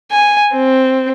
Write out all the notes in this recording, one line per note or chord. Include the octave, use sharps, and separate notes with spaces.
G#5
C4